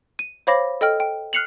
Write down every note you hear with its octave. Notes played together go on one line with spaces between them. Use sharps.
D#7
C5 C#5 F5 B5 D6 A#6
A4 D#5 G5 F6
G5
F6 F#6 C7 C#7 F7 F#7